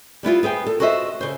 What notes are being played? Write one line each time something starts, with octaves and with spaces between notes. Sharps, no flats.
G3 B3 E4 F4
B3 G#4 C5 G5
A4
F#4 A4 C5 D#5 E5
C#3 C5